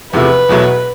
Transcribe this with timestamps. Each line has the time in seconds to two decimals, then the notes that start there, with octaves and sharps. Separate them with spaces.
0.13 E2 C3 F3 A3 B4
0.49 E2 B2 F#3 A3